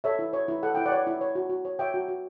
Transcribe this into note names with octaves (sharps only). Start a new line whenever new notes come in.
A4 C#5 E5
E4
C#5
E4
A4 F#5
E4 G5
D5 F#5
C#5
E4
C#5
F#4
F#4
C#5
C#5 E5 G5
F#4
F#4